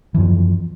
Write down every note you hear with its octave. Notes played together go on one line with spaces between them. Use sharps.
F#2 E3 F3